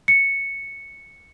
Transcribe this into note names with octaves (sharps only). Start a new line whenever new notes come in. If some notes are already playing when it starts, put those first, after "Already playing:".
C#7